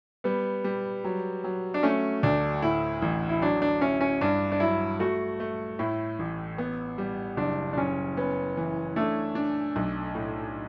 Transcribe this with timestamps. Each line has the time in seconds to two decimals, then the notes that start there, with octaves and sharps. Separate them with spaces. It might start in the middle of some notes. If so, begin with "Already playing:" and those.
0.24 G3 B3
0.64 G3
1.04 F#3
1.44 F#3
1.74 D4
1.83 A3 C#4
2.23 D2 D4
2.62 A2 E4
3.02 A1
3.29 E4
3.41 F#3 D4
3.62 D4
3.81 C#4 E4
4.01 C#4
4.21 G2 D4
4.52 D4
4.60 F#3 E4
4.99 A3 F#4
5.40 A3
5.79 A2 E4
6.19 A1
6.58 B3
6.98 G3
7.37 F#1 D4
7.73 D4
7.77 F#1 C#4
8.17 B3 C#4
8.57 E3
8.96 A3 D4
9.35 D4
9.76 B1
10.15 A2